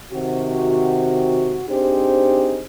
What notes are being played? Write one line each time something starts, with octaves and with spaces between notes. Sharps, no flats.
C3 D#3 C4 F#4
C4 D4 D#4 G4 G#4 C5